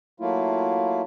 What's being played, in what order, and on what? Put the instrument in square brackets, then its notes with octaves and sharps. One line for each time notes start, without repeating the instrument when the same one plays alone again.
[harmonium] F#3 A3 A#3 E4 F4